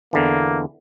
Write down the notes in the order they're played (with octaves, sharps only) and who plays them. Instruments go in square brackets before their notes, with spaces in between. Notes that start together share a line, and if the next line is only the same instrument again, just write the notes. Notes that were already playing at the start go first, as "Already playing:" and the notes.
[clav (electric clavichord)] E2 D3 E3 [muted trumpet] A#3